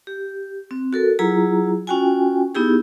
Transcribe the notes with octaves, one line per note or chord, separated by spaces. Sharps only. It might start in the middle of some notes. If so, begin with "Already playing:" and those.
G4
C4
F#4 A4 A#4
F#3 E4 F4 G#4 A#5
C#4 F4 F#4 G5 G#5
B3 D#4 E4 G4 G#4